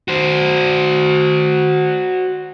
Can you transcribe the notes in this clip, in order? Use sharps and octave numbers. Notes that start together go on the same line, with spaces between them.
F#4 C5